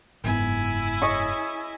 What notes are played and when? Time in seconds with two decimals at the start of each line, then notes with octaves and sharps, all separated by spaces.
0.24 F#1 G#2 B3 E4 G#5
1.02 D#5 C#6